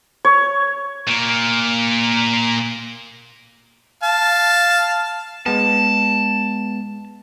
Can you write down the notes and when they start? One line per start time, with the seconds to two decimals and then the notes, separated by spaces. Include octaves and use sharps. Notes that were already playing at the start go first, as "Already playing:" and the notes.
0.25 C#5
1.07 A#2 A#3
4.03 F5 A5
5.46 G#3 B3 A5